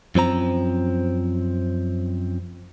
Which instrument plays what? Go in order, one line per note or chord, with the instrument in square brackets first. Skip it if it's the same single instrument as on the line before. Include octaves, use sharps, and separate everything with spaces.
[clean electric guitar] F#2 F3 C4 A#5